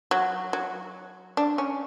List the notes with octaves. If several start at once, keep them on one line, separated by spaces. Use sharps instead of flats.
F#3
F#3
D4
C#4